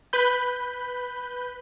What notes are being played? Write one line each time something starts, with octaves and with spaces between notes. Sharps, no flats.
B4 B5 G6